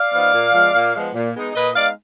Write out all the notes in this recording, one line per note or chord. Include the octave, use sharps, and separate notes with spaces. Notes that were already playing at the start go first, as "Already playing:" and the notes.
Already playing: D5 F5
F3 B3 D#4
A#2
F3 G#3 B3
A#2
F3 G#3 B3
A#2
G#3 B3 D#4
A#2 B4 D#5
G#3 B3 D#4 D5 F5